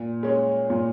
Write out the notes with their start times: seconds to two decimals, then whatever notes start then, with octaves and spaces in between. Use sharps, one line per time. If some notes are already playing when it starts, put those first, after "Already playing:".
Already playing: A#2
0.23 G#3 C#4
0.70 A#2